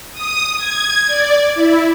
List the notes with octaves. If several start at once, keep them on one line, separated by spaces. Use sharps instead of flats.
D#6
G#6
D5
E4